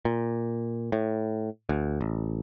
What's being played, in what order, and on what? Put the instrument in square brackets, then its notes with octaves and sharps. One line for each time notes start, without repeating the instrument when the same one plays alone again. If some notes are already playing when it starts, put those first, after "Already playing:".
[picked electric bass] A#2
A2
D2
A1